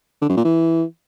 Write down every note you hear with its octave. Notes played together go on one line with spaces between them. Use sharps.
D3
F#2
A#2
E3